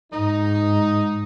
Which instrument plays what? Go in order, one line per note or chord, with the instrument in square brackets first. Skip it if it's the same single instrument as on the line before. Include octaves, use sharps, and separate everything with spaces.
[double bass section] G#2 [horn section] D#4